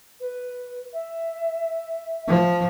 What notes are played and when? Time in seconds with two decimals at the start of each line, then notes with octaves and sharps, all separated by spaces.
0.20 B4
0.93 E5
2.28 F3